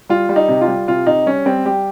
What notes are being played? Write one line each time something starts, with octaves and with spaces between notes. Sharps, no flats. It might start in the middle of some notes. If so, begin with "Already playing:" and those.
G3 F4
G3
D#4
C3
F4
G3
C3 F4
C3 D#4
G3 C#4
G3 C4
G3 G4